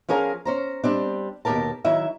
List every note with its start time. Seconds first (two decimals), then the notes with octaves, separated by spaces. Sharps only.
0.09 F3 C#4 G#4 A#4 F5
0.45 C#4 C5 A#5
0.84 G3 C4 D4
1.45 D#2 B2 G#3 G4 A#4 A5
1.84 D#3 F#3 E4 E5